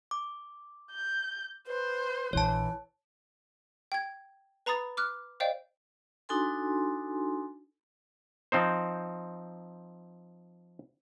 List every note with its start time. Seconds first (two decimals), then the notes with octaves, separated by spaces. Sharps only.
0.11 D6
0.92 G6
1.67 B4 C5
2.33 A#1 E3 E4 C#5 A5
3.92 G5 G#6
4.66 B4 A#5 B5 D#6 A6
4.97 D6 F6 F#6
5.40 C5 D5 D#5 F5 G5
6.29 D4 D#4 F#4 A4 G#5 C6
8.52 F3 C4 D#4 C5